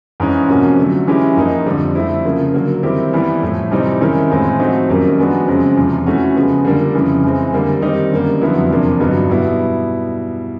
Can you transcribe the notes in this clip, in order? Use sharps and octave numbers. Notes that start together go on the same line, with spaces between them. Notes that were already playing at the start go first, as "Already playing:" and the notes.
G#2 E3 G#3 C#4
C3 F3 A#3 C#4 F#4
D3 F#3 A3
E3 G#3 C#4 E4 G4
G#2 F3 A#3 D#4
F2 D3 G3
D3 F3 A3 C4 E4
C#3 F3 A#3
D3 F#3 A#3
D#3 G3 C4 E4 G4
E3 G3 B3 E4 G4
A2 F3 A3
C3 E3 G3 C4 D#4
D#3 G#3 C#4 E4
A2 E3 G#3 C4 F4
F3 A3 C4 D#4 F#4
F#2 D#3 G3 A#3
F3 G#3 B3 D4 F#4
F#2 C#3 F3 G#3 C4
E2 C3 F3
E3 A3 C#4 F#4
C#3 F3 G#3 B3
D3 G3 A#3 D4
F2 C#3 E3
E3 G#3 C4
D3 G3 A#3
D#3 G3 C4 D#4 G4
F#2 D3 G3 A#3
F2 D3 F#3 B3 E4
E2 C3 F3 A#3 D4
G2 D3 F#3 B3 D#4
B2 G3 B3 E4